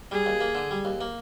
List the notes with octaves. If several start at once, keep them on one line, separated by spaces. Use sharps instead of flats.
G3 G#4
D#2
A#3
D3
G3
D#2
A#3